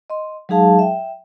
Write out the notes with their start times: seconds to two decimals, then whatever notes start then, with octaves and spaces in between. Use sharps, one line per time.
0.10 D#5 C6
0.49 F#3 G#3 D#4 G#4 F5 A5
0.79 E5 G5